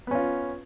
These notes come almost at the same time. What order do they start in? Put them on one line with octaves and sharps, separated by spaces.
B3 C#4 F4